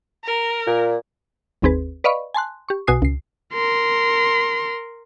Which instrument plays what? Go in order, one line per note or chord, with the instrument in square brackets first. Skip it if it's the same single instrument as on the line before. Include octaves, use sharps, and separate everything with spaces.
[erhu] A#4
[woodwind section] A#2
[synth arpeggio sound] G1 D#2 C4 G#4 B4
B4 D5 D#5 F5 B5 C#6
G#5 A5 C6 F#6
G4 C#6
B1 B2 F#4 G#5 D#6 C7
C#2 C7
[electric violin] A#4 C6